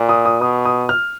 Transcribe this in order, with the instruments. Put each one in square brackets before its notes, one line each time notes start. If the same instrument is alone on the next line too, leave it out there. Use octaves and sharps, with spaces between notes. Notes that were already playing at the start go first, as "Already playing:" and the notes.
Already playing: [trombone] A#2
[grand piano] D#6
D#6
[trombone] B2 [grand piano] D#6
[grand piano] D#6
F6